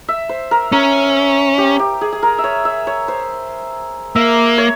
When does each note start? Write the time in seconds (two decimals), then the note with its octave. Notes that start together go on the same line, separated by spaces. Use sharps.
0.08 E5
0.29 C5
0.51 A#4
0.72 C#4 A#4
1.58 G4
1.79 G4
2.01 G#4
2.12 G#4
2.23 A#4
2.38 E5
2.44 C#5
2.65 E5
2.87 C#5
3.08 C5
4.15 A#3 E5
4.58 C#5